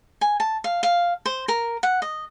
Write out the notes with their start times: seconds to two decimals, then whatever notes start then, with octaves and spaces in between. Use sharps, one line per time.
0.21 G#5
0.40 A5
0.64 F5
0.83 F5
1.26 C5
1.48 A#4
1.83 F#5
2.02 D#5